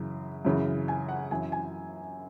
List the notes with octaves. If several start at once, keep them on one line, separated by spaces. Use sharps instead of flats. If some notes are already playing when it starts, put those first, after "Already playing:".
Already playing: F#2 C#3 E3
F#2 C#3 E3
G#5
F#5
F#2 E3 G#5
G#5